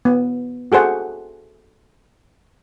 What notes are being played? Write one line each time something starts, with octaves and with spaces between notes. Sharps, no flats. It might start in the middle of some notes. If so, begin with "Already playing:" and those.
B3
F#4 G#4 A4 C5 F#5